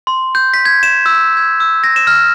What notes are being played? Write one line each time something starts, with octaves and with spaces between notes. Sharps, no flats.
C6
G6
B6
G#6
E7
E6
G#6
E6
A#6
E7
F6